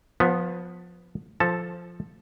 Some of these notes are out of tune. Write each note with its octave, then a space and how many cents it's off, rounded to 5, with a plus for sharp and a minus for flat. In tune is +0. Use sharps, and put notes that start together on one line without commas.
F3 +20 B3 +0
F3 +0 A4 +0 A5 +0